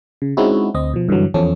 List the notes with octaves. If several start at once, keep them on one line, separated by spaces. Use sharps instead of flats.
C#3
G#3 C4 C#4 D#4 E4 F#4
D2 C4 D#5
B2 F3
G2 D3 E3 F#3
E2 F3 C#4 A4